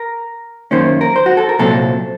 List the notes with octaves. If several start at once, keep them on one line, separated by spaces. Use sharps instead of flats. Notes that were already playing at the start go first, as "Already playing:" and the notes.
Already playing: A#4
F#2 D#3 A#3 C#4 C5
A#4
C5
F#4
A4
A#4
C2 A#2 F#3 C4 A4